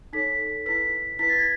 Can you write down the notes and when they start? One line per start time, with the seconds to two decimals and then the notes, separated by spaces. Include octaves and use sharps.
0.13 D#4 A4 C#5 B6
0.66 E4 B4 B6
1.19 E4 B4 B6
1.29 A6
1.39 G#6